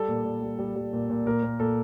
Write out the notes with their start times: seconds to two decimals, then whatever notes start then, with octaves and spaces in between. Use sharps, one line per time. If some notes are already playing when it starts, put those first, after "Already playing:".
Already playing: G3 A4
0.08 A#2
0.25 A#2
0.42 G3
0.59 G3
0.76 G3
0.93 A#2
1.10 A#2
1.26 A#2 A#4
1.43 A#2
1.60 A#2 A4